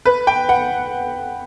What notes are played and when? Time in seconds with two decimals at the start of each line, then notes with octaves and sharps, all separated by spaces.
0.05 B4
0.27 G5
0.49 F#5